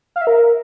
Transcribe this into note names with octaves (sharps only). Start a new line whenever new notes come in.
F5
E5
A#4